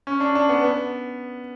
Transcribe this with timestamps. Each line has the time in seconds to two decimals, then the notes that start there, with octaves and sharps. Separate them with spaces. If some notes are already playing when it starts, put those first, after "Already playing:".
0.07 C#4
0.20 D4
0.35 D4
0.49 B3
0.64 B3